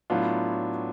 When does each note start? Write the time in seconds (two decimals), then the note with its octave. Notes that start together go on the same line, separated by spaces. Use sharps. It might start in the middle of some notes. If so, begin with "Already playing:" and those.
0.10 A2 F#3 B3 D4 F4